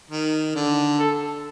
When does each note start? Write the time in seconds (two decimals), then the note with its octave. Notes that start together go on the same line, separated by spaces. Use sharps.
0.11 D#3
0.55 D3
0.99 A4